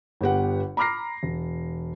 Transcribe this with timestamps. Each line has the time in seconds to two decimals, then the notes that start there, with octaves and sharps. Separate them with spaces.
0.21 G1 B3 G4 F#5
0.77 A#5 B5 D6 F6 A#6 C7
1.23 E1